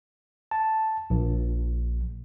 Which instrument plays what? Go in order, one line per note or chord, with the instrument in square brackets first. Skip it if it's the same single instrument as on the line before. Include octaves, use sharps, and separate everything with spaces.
[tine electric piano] A5
A#1